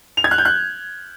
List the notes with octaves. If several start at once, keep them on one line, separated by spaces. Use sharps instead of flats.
F7
G#6
F#6
G6
F#6